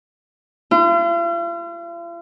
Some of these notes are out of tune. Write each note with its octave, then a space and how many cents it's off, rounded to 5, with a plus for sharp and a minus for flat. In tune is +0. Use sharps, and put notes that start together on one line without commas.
F4 -45